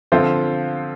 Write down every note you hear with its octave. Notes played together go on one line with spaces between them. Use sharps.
D3 F3 C4 F4 C5